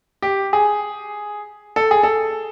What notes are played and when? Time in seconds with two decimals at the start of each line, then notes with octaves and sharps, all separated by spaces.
0.22 G4
0.53 G#4
1.76 A4
1.91 G#4
2.03 A4